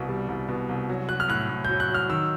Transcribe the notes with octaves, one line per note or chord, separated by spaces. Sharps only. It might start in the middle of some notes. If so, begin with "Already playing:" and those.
Already playing: C2 B2
G3
C2
B2
C2
F#3
F#3 F#6
F6
A2 F#6
A2
F#3 G6
F#6
F#3 F6
D#3 E6